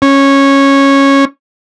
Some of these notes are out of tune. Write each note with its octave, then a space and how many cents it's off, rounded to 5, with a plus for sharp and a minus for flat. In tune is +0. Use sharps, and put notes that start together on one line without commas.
C#4 -10